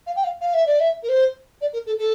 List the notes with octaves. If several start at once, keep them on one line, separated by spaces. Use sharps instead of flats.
F5
G5
F5
F5
E5
D5
E5
A#4
C5
D5
A#4
A4
A4